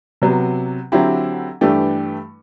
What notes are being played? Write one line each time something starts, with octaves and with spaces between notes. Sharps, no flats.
C3 F#3 B3
D3 F#3 C4 E4 G4
G2 E3 A3 D4 G4